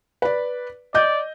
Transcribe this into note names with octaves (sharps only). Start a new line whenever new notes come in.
B4 D5
D5 D#5 G6